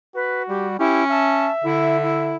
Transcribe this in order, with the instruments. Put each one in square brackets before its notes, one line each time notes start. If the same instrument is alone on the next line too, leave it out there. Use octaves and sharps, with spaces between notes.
[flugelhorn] F#4 [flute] B4
[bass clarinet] G3 [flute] G4
[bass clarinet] C#4 [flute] E4 [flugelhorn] G4
[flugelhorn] E5 [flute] A5
[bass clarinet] D3 [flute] E4
[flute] E4